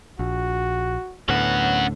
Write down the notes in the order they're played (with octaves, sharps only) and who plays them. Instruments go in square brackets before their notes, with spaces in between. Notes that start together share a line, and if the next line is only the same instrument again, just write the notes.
[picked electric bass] A#1 [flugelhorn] F#4
[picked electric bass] D2 A2 D3 [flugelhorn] B3 [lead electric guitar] C#4 F#5